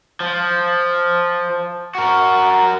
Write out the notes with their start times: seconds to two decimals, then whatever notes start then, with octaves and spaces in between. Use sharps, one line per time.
0.20 F3
1.95 F#4 A#4